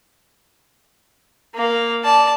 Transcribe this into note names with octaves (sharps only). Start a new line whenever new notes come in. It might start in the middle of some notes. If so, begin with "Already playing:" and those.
A#3 F5
D5 A5